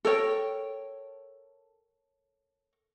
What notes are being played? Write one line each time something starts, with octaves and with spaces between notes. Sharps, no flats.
A4 A#4 C#5 G5